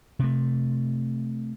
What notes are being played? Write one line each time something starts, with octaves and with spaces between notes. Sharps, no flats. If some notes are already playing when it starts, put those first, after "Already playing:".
C3 A3